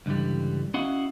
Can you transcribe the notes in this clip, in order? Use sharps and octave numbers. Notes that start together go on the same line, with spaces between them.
C#2 G2 D3 E3 G3
C#4 E4 F#4 D#5 F5 F#5